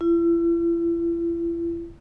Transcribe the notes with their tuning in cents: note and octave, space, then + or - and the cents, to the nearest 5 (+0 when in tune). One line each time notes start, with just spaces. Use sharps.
E4 +40